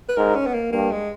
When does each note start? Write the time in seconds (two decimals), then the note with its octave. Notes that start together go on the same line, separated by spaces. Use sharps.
0.09 B4
0.17 G#2 A#4
0.35 C#4
0.46 B3
0.54 A#3
0.72 G2 A#3
0.91 G#3